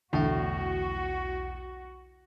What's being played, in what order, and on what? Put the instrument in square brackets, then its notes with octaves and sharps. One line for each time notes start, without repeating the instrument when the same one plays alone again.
[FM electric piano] B1 E2 E4 [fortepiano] A2 [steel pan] D3 [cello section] F#4